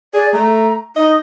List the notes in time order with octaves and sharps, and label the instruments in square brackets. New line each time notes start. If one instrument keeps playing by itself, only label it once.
[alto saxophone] G#4 [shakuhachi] D5
[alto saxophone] A3 [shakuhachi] A#5
[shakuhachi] D#4 [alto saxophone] D#5